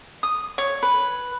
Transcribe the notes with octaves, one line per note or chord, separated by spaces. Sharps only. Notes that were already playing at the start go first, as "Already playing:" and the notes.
D#6
C#5
B4